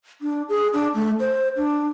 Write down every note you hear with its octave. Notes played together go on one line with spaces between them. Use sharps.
D4
G#4
D4
A3
C5
D4